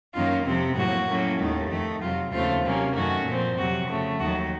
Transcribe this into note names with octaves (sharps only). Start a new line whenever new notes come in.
F#2 D#3 A#3 C#4 F4
F2 C3 F3 C4
A2 F#3 A#3 F#4
A2 F#3 A#3 C#4
D#2 D#3 A3
F2 D#3 A3
F2 C3 F#3 F4
D#2 C#3 A3 C4 F4
C3 F#3 A#3 C#4
F#2 D#3 A3 C#4 F#4
A#2 F3 C4
F2 C3 F#3 F#4
C#3 F3 A3
D#2 D#3 F#3 F#4